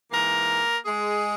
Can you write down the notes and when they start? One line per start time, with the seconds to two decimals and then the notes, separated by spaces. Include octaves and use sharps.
0.10 G#2 E3 A#3 A#4
0.86 G#3 G#4